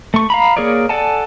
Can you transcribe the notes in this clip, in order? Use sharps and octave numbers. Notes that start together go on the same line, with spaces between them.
A3 C#6
F5 A#5 B5
A#3 G#4 A#4 C#5 D5
A4 D5 F#5 G#5 A5